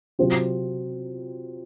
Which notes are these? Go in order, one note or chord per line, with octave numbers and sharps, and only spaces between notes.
C3 F#3 C4 F4